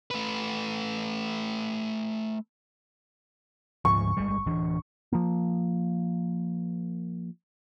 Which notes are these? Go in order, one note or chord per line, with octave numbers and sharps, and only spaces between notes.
A3 B4
D2 G#2 F3 C#6
G1 G3 G#3
D1 E3 D4
F3 A#3